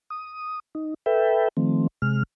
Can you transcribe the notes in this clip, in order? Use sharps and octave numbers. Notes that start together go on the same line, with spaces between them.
D#6
D#4
A4 B4 E5 G5
D#3 F3 A3 C4
C3 G#3 F6